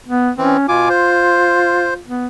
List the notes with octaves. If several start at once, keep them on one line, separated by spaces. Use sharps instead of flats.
B3
E3 C4 C#4
B2 F4 G#5 D6
C5
B3